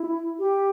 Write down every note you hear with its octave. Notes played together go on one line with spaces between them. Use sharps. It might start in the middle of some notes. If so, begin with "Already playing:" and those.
Already playing: E4
G4